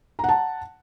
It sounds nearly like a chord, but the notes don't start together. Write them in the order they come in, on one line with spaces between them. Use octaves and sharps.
A#5 F#5 A5